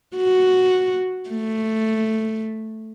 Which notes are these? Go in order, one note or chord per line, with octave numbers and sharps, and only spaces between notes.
F#4
A3